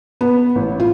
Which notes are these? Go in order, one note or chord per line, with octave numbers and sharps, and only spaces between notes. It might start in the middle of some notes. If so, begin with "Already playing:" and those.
B3
A1
F4